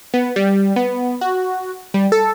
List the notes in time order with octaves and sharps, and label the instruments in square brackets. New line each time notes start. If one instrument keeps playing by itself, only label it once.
[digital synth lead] B3
G3
B3
F#4
G3
A4